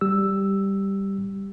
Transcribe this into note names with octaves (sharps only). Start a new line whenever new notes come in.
G3 G4 E6